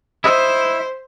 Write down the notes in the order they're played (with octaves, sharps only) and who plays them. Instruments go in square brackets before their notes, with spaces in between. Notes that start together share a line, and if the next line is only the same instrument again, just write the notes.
[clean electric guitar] E4 D#5 E5 [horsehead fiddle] C5